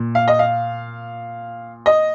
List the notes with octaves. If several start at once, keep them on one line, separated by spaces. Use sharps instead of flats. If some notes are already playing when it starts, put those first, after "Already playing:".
Already playing: A#2
F5
D#5
F5
D#5